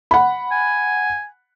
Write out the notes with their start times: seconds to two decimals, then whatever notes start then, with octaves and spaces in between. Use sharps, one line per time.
0.11 F#5 B5
0.51 G#5